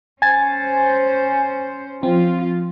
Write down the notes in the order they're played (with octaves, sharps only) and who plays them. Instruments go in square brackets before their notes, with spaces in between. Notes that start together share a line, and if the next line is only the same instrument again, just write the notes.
[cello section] C#4 C5 [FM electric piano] G#5 A6
[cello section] F3 F4 [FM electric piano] C4